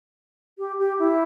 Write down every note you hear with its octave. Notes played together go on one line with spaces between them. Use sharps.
G4
G4
E4